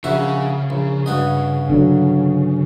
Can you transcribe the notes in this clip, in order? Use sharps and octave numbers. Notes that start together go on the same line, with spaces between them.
A#1 C#3 F#4 E5
A#1
G2 F#4 D#5
D3 F#3